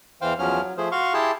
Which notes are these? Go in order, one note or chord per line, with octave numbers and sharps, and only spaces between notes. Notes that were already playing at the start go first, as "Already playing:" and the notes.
E2 E3 C5 F5 G5 F6
E2 F3 F#3 C#4 F6
F#3
F3 A3 G#4 C5
F#4 F5 C6 C#6
E4 G4 G#4 G5 A5 C6